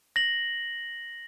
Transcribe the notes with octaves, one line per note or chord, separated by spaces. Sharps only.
A#6 F#7